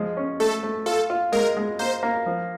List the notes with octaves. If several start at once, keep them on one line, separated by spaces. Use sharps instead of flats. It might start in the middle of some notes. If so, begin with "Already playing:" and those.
Already playing: F3 G#3
C#4
A3 A4
A3
F4 A4
F4
G#3 A#4
G#3
A#3 C5
A#3
F3